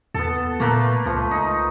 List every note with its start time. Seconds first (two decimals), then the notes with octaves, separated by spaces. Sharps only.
0.14 E2 B3 A4
0.60 A#2 A3 A#3 B4
1.06 C#2 F3 A3
1.31 D#4